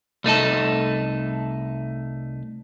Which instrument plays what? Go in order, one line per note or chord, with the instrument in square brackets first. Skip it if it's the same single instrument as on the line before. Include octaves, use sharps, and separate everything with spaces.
[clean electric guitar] C2 A3 D#4 A4